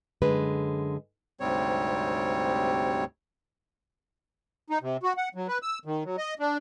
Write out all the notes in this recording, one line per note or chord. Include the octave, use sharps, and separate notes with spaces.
F#2 D3 G#3 B4
D2 G#2 C3 G3 C4 C#5
D#4
C3
F#4
F#5
F#3
B4
E6
D#3
F#3
D#5
D4